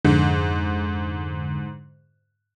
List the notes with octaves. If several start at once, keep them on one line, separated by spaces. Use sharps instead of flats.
F2 G#2 D3